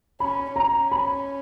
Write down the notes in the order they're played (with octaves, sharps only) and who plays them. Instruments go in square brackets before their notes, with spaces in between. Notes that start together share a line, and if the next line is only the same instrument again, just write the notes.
[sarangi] C#4 [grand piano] B5
[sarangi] C#4 [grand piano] A#5
[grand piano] B5